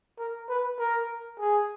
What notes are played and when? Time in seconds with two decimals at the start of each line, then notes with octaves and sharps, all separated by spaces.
0.19 A#4
0.49 B4
0.79 A#4
1.40 G#4